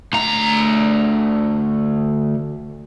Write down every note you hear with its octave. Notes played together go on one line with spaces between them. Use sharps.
D2 A#5